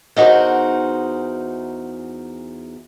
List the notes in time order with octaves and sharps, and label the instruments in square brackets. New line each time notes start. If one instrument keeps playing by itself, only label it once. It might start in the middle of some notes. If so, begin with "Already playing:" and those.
[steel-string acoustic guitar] E2 D#4 F#4 A#4 C5